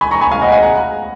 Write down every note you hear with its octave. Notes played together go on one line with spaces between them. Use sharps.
G#5 B5
A#5 C#6
G#5 B5
F5 G#5
D#5 F#5
F5 G#5
F#5 A#5